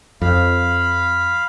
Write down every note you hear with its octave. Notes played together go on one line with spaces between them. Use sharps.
F2 F5 B5